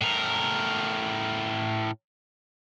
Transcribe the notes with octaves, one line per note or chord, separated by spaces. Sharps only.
A2 A#4